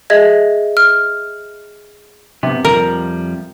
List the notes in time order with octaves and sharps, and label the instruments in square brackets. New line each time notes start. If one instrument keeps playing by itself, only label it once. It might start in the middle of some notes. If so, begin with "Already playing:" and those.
[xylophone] G#4 D#5 E5 G#6
F6
[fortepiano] C3 [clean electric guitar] B3
[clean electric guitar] F2 F3 G3 [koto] A#4